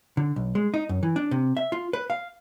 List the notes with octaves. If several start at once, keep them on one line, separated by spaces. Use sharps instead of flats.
D3
B1
G#3
D#4
F#2
E3
D4
C3
E5
F4
B4
F5